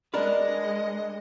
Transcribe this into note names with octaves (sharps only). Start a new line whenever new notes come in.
G#3 D4 A#4 B4 D#5